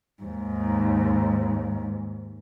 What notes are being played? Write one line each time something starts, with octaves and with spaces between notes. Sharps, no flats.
D#2 G#2